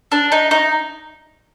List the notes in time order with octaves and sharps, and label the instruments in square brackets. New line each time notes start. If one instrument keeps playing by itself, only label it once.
[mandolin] D4
D#4
D#4